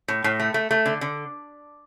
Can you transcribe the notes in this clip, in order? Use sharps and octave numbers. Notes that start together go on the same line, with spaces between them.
A2
A2
A3
A3
A3
D3
D3